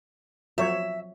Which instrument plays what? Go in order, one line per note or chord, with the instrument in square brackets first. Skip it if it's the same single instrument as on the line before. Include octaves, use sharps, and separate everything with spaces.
[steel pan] F3 F#3 C#5 [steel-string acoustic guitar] E5